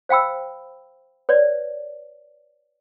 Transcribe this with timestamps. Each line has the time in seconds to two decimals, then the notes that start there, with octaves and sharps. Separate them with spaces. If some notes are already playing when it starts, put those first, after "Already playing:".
0.09 C5 F5 G5 B5 E6
1.29 B4 C#5 D5